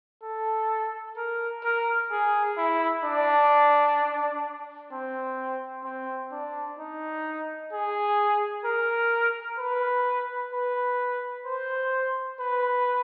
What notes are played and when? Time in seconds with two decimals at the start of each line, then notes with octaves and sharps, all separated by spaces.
0.23 A4
1.17 A#4
1.64 A#4
2.11 G#4
2.57 E4
3.04 D4
4.92 C4
5.84 C4
6.32 D4
6.79 D#4
7.72 G#4
8.65 A#4
9.59 B4
10.53 B4
11.46 C5
12.40 B4